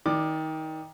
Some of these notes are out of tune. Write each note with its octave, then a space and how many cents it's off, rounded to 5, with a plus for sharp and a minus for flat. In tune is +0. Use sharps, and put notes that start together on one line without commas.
D#3 +20 D5 +0 D6 +20